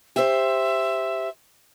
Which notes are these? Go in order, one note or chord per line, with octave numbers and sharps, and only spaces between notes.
G4 C5 E5